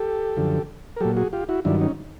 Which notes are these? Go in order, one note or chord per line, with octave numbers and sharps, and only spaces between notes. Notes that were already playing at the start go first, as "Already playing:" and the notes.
Already playing: G4 A4
F#2 D3 F3
A#4
A#2 F#3 G4 A4
F#4 G#4
F4 G4
E4 F#4
G2 D#3 F#3 D4 E4
C#4 D#4